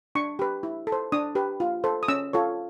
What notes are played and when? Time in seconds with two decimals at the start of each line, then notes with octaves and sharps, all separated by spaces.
0.15 D4 C#6
0.39 G4 B4
0.63 E4
0.87 A4
0.92 C5
1.12 D4 D#6
1.35 G4 B4
1.60 F4
1.84 A4 C5
2.03 D#6
2.08 C#4 E6
2.33 F4 A4 C#5